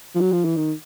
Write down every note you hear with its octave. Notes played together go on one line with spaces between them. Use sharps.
F3
F#3
F3
E3
D#3